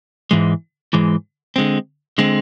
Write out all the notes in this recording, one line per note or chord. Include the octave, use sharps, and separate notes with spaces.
G#2 E3 G#3
G#2 E3 G#3
D3 G#3 C4
D3 G#3 C4